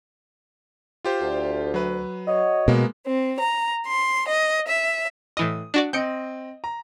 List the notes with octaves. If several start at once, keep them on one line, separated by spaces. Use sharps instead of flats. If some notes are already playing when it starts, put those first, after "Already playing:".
F4 G4 C5
D2
F#3 B4
F#4 C#5 D#5
B2 G#3 A#3 B3
C4
A#5
C6
D#5
E5
A2 E3 D#5 D#6
D4 F#4 D5
C4 D#5 G6 C#7 D7
A#5